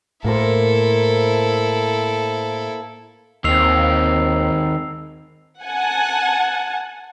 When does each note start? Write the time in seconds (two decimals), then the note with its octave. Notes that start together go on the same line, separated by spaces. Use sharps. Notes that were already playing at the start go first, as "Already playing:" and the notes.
0.25 A2 A#3 E4 A4 A#4 C5
3.44 D#2 D#3 C4 E6 C7 F7
5.63 F#5 G#5 A5